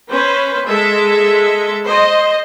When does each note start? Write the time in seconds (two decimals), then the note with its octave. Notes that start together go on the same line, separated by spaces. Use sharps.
0.10 C#4 B4 C5
0.66 G#3 A4 E5
1.84 C5 D#5